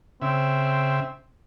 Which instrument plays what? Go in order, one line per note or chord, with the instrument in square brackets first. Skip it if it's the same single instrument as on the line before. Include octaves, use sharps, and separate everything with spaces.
[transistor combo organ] C#3 E5 [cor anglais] C4